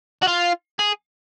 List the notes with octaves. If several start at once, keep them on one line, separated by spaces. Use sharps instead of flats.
F#4
F4
G#4